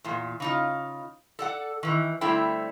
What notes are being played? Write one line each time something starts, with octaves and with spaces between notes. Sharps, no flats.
E2 A#2
C#3 D#4 F4
A4 D5 F#5
D#3 E3
D3 G3 A3 C4 E4 G5